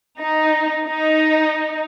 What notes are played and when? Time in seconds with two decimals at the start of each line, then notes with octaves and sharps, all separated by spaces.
0.19 D#4
0.85 D#4